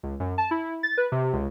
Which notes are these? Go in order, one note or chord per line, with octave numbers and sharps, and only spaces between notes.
C#2
F#2
A5
E4
A6
B4
C3
C#2